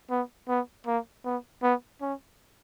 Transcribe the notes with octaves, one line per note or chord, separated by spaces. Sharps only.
B3
B3
A#3
B3
B3
C#4